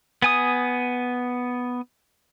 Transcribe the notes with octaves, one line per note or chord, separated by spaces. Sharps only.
B3 G#5 D#6